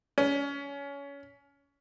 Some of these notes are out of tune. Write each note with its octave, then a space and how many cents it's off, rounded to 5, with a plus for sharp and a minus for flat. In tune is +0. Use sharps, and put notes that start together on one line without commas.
C#4 +25